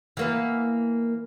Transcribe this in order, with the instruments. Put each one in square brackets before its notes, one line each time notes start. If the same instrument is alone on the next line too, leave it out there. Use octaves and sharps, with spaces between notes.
[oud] E3 A#3 B3